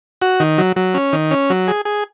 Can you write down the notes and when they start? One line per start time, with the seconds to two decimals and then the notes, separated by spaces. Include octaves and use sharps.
0.22 F#4
0.40 D#3
0.58 F#3
0.76 F#3
0.94 C#4
1.13 D#3
1.31 C#4
1.50 F#3
1.68 G#4
1.85 G#4